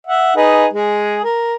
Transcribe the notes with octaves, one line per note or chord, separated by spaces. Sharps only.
E5 F#5
D#4 G#4 B4
G#3 G#4
A#4